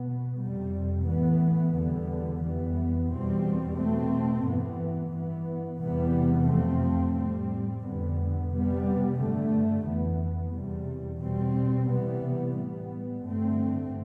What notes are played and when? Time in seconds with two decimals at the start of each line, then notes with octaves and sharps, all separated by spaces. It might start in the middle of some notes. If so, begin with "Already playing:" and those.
Already playing: B2 B3
0.40 F2 C3 G3
1.08 A2 E3 B3
1.75 E2 D3 G3 B3
2.42 F2 E3 G3 B3
3.10 E2 B2 G3 C4
3.77 B2 A3 C4
4.46 G2 E3 B3
5.13 G2 E3 B3
5.81 E2 C3 E3 G3 B3
6.48 F2 C3 F3 A3 C4
7.16 A2 G3 C4
7.83 F2 D3 G3 B3
8.52 C3 G3 B3
9.19 G2 D3 A3
9.86 F2 E3 B3
10.54 E2 C3 G3
11.22 B2 G3 C4
11.90 C3 E3 G3 B3
12.57 A2 G3 B3
13.25 G2 D3 A3 C4